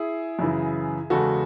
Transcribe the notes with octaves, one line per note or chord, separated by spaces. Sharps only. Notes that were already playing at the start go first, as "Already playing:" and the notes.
Already playing: E4 G#4
F#2 C#3 E3
E2 C#3 G#3 F#4 A4